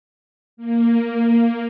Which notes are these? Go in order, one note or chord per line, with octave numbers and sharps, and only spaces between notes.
A#3